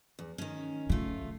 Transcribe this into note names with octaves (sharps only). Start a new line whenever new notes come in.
E2
D#3 C#4
C#3 A3 F4